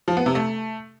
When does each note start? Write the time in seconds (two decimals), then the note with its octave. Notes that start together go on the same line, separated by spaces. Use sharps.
0.08 F3
0.17 B3
0.26 C3
0.35 A3